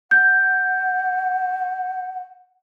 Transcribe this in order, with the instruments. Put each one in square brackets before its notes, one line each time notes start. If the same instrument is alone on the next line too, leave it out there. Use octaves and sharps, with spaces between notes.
[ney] F#5 [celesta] G6